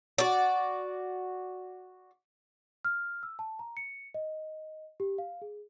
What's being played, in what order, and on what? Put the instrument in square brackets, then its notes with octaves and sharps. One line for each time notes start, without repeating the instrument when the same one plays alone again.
[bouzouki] F#4 D5
[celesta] F6
E6
A5
A#5
C#7
D#5
G4
F5
G#4